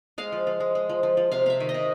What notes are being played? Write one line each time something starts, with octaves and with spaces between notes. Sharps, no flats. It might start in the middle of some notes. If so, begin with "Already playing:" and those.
G#3 F5
F3
F3
G#3
G#3
F3
F3
F3
C3 F5
C3 E5 F5
D#3
D#5
C3